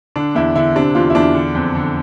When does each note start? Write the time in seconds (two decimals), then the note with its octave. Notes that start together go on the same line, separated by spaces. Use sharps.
0.16 D3 D4
0.35 E2 E4
0.55 D3 E4
0.75 C3 D4
0.95 E2 F4
1.10 E4
1.15 E2 D4
1.35 D3
1.55 F2
1.75 D3